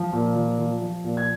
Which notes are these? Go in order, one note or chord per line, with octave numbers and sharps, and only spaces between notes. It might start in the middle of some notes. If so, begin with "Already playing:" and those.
Already playing: F3
A#2
F3
F3
F3
A#2
G#6